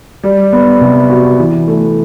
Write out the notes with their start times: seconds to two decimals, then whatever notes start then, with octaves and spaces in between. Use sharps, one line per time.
0.23 G3
0.53 B3
0.81 C3
1.10 F#4
1.39 E3
1.68 A3